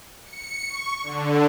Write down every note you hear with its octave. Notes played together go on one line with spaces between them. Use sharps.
C#7
C#6
D3